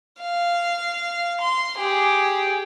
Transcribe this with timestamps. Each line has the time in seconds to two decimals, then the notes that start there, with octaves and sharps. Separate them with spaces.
0.21 F5
1.41 C6
1.78 G4 G#4